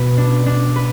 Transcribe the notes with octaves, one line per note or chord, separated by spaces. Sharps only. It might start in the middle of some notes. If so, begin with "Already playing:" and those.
Already playing: B2 B4
D4
D4
B4